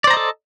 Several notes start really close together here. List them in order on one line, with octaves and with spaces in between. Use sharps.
D5 C5 A#5 D#5 A4